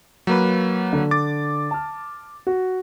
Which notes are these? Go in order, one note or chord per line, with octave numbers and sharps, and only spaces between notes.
F#3 A#3 B4
D3
D6 A6
A5 F6
F#4